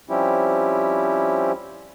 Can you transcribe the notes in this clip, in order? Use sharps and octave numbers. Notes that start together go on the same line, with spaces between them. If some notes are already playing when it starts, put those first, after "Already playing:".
F3 G3 C4 C#4 E4 G4